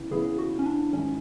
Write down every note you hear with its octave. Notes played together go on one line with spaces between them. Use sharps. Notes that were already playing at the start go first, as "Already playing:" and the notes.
Already playing: C#3 E3 B3 E4
C#3 E3 B3 E4 G#4
F#4
C#4
D4
G#1 G#2 E3 C#4